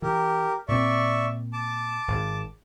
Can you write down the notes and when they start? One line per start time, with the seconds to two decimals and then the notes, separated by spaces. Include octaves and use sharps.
0.02 E3 G4 A#4
0.68 A#2 C4 D5 E5 C#6
1.53 A5 D6
2.08 G#1